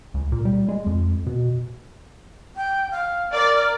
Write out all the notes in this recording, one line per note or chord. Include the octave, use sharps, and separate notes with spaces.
C#2
A#2
G3
G#3
F2
B2
G5
F5
A#4 D5